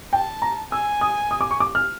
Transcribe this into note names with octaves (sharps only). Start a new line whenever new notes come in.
G5 A5
A#5
G#5 E6
D#6
D#6
D6
C#6
D6
F6